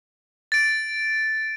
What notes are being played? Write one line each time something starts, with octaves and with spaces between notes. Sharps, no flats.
A6 D7